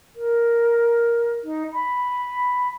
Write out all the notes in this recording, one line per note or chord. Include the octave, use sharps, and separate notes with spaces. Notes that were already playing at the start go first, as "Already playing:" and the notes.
A#4
D#4
B5